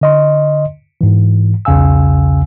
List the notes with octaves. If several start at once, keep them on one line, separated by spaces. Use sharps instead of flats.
D3 D#5 C6
G#2 E3
B1 E2 C#3 F5 G#5 E6